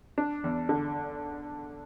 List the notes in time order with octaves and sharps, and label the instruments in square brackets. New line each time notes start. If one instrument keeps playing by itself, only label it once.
[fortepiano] D4
E2
D3